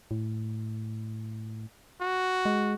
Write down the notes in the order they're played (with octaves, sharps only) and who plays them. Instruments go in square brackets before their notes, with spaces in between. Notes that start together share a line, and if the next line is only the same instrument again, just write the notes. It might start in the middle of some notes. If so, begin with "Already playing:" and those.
[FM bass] A2
[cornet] F#4
[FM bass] G#3